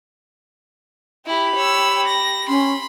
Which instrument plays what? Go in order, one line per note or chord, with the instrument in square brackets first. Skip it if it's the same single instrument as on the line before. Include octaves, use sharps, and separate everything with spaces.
[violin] E4 [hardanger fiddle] G4 B5
[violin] C#5 E6
A#6
[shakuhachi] C#4 [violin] B5 C6